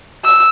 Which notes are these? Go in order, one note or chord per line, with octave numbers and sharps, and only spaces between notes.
E6